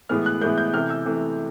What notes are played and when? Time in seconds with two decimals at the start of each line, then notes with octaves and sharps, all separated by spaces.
0.09 A2 E3 G#3 B3 F6
0.26 F#6
0.41 A2 E3 G#3 B3 G6
0.58 G6
0.73 C3 E3 A3 F6
0.90 E6
1.06 C3 E3 A3